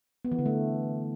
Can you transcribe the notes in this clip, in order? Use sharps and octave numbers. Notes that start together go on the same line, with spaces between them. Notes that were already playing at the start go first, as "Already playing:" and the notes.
B3
E3
D3
A3